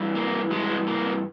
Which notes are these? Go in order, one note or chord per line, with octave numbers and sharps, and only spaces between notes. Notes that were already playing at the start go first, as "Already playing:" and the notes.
Already playing: G2 E3
A#3
G2 E3 G#3
A#3